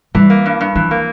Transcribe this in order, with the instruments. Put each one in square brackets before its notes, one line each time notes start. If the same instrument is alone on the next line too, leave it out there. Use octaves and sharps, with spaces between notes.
[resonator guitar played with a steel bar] E3 [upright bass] G3
[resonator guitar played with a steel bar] A#3
G2
G2
[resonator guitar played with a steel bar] E3 [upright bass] F3
[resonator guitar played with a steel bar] A#3